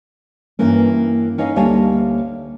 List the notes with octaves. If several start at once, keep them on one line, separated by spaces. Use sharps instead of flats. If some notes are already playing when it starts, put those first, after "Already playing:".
G2 E3 A#3 C#4
C#4 D#4 C#5 D#5 F5
D2 G3 A#3 C#5 G#5 A5